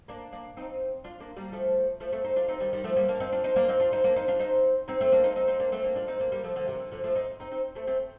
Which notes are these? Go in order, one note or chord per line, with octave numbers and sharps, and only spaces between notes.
A#3 D4
A#3 D4
C4 D#4
D4 F4
A#3 D4
G3 A#3
F3 A3
F3 A3
A3 C4
C4 D#4
D4 F4
C4 D#4
D#3 G3
D#3 G3
F3 A3
G3 A#3
A#3 D4
C4 D#4
D4 F4
C4 D#4
A#3 D4
C4 D#4
D4 F4
C4 D#4
A#3 D4
C4 D#4
D4 F4
C4 D#4
C4 D#4
A3 C4
A#3 D4
C4 D#4
C4 D#4
C4 D#4
A#3 D4
A3 C4
A#3 D4
D4 F4
C4 D#4
A#3 D4
G3 A#3
F3 A3
D3 F3
C3 D#3
D3
D3 F3
F3 A3
C4 D#4
C4 D#4
C4 D#4
A3 C4
A3 C4